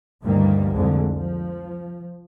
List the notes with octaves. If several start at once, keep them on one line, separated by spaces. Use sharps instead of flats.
D2 G2 D#3 E3 G3 A#3
C2 F2 D3 G#3
F3